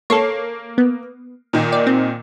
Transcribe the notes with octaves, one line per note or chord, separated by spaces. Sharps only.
A#3 A4 C#5 C7
B3
A#2 D#3
D5
C4